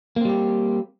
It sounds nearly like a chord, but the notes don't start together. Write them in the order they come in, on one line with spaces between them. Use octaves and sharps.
A#3 C4 G3 G4